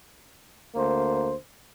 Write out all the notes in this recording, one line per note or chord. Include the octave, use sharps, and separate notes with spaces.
D2 A#3 C5